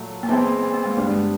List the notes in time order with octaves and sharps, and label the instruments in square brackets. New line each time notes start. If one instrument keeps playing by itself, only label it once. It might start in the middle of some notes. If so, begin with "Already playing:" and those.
Already playing: [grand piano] A#2 F#3 A3
[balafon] A#3
[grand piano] E3 G#3 C4 E4 [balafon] B3
[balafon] A#3
A#3
G#3
[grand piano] G2 D3 G3 B3 D4 [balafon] G#3